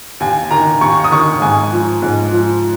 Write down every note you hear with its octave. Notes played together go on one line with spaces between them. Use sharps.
D#2 G#5
D#3 A#5
D#2 C#6
D#6
D#3 C#6
G#2 G#5
F3
G#2
F3